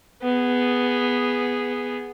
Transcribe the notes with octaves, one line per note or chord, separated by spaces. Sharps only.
B3 G#4